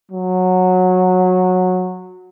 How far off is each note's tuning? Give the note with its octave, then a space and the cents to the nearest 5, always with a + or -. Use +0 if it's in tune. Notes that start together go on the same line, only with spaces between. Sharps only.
F#3 -15